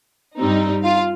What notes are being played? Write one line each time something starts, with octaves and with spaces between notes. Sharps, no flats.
G2 G3 C4 D#4
F4 F5